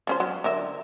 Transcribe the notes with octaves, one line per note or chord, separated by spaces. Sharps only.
F3 C#4 C5
F#3
D3 A#4 E5